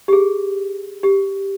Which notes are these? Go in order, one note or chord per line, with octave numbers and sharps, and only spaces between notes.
G4
G#4
G4